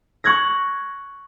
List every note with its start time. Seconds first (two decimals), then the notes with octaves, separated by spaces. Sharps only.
0.24 C#6 F#6 G#6 A#6